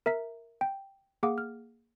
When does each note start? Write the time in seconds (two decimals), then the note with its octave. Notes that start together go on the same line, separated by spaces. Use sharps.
0.06 A#4 E5 A#5 B6
0.61 G5
1.23 A#3 G#4 F5 F#5 D6
1.38 F6